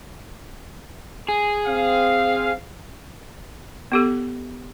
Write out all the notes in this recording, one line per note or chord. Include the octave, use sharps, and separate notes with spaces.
G#4
C4 F5
B3 G4 A4